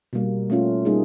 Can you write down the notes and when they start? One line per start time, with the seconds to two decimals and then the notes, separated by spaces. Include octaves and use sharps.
0.13 B2 G3 A#3
0.50 A3 C#4 F4
0.85 G3 A#3 D#4 G#4